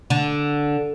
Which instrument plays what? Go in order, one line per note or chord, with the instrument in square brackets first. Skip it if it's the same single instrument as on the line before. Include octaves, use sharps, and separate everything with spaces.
[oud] D3